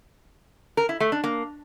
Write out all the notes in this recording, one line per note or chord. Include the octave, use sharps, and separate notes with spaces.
A#4
E4
A3
D4
A#3